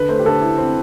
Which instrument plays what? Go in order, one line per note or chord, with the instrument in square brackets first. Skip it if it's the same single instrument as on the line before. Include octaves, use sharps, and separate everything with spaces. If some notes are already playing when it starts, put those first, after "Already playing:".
Already playing: [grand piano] D3 [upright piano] B4
[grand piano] A3 [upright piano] C5
[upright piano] G4
[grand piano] D3 [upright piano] A4
[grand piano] E4
C4